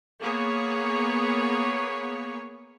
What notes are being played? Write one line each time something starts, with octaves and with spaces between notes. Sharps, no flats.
A#3 B3 G#4 C#5